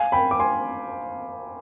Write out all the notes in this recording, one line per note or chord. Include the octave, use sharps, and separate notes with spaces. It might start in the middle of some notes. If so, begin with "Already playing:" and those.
Already playing: F5 G#5
G5 B5
D6
G#5 C6